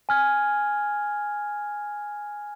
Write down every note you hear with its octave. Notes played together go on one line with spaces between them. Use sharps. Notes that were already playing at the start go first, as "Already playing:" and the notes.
G#5 F6 G#6